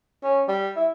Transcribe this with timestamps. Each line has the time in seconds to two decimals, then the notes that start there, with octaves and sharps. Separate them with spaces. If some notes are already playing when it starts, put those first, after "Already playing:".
0.24 C#4
0.48 G3
0.77 E4